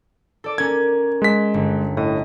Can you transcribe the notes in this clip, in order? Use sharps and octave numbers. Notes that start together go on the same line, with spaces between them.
A4 D5 D6
C#4 A#4 G#6
G#3 B6
G1
A2 D#5